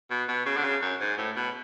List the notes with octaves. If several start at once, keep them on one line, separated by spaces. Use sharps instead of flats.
B2
B2
C#3
D3
C#3
F#2
G#2
A2
B2